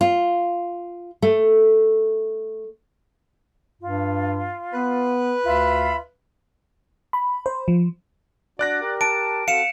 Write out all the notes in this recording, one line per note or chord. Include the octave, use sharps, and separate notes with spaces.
F4
A3
G2 F4
B3 B4
D2 F4 E5 B5
B5
C5
F3
D4 F#4 D5 F#6 A#6
G4 A#4
A5 D7
C4 F#4 A4 F5 C#7 E7